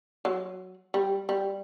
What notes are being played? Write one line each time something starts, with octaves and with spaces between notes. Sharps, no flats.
F#3
G3
G3